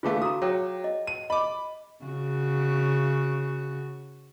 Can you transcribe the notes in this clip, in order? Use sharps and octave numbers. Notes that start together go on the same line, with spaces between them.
D3 E3 A3 F4 G#4 F5
F#4 A#5 D#6
F#3 G#4 C#5 G5
D#5
D#7
D#5 B5 D6
C#3 F#4